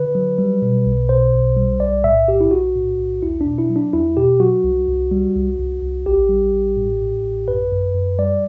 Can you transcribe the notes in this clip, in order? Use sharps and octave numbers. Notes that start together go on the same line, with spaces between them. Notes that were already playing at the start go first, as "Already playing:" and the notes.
Already playing: D3 B4
F#3
G3
B2
B1
B2 C5
B1
G3
B1 D5
A2 E5
B1 G4
E4
B1 F#4
A2
B1
E2 E4
D4
B2
E4
F#3
D4
E2 E4
B2 G4
F#3 F#4
C2
C2
G3
C2
C2
C2
A1 G4
G3
A1
A2
A2
A1
F#2 B4
F#2
F#2
G3 D5